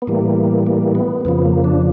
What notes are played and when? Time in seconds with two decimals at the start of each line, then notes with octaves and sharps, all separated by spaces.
0.02 B3
0.07 A2 E3 G3 A#3
0.67 A#3
0.95 B3
1.25 F2 C#3 F3 B3
1.45 A#3
1.64 D4